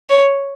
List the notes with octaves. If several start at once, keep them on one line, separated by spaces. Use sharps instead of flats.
C#5